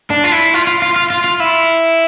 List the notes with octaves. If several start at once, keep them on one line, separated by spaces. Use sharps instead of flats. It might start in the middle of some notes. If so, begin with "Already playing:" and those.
D4
F4
E4
F4
F4
F4
F4
F4
F4
E4